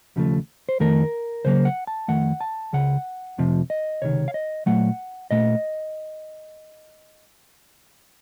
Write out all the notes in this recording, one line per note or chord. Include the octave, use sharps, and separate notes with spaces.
D#2 C#3 F3 A3
C5
F2 D#3 A3 A#4
C#2 C#3 F#3 A#3 C5
F#5
A5
F2 D#3 A3 F#5
A5
C#2 C#3 F#5
F2 C3 F3
D#5
C#2 C3 D#3 C#5
F5
D#5
A#2 F#3 A3 F#5
A#2 A3 D#5